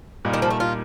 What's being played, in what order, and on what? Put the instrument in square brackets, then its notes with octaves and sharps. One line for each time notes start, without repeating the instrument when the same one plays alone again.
[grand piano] A#2 G3 A#3 D#4
[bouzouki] D#3
F3
A3
F4